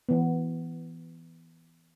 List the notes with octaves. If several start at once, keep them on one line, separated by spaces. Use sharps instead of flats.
E3 B3